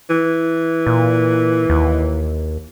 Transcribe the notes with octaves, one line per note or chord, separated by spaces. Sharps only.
E3
A#2
D#2